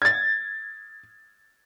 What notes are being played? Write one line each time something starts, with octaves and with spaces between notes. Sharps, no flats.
G#6 A6